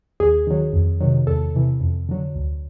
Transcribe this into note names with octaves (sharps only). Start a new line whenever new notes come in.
D#2 G#4
D#3 F#3
F2
C3 D#3 F#3
E2 A4
C3 E3
F2
D3 F#3
D2